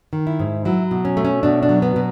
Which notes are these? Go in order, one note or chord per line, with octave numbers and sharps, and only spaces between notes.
D#3
E4
G#2
F#3 E4
B2
C#4
A3
C#4
B2 D4
D4
F#3
B3
B2